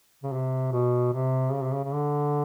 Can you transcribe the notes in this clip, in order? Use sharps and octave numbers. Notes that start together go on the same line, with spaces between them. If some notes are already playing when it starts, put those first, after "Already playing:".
C#3
C3
B2
C3
C#3
C3
C#3
C#3
D3